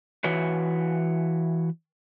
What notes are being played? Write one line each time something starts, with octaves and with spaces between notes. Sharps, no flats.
E3 F#4 B4 C#5